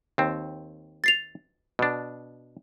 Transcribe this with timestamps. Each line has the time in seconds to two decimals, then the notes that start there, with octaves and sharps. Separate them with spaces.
0.18 D#2 C4
1.04 A6 C7 F7
1.79 B2 D4